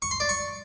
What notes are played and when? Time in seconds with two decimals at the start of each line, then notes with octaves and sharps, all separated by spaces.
0.02 C#6
0.11 C6
0.20 D5
0.29 C#6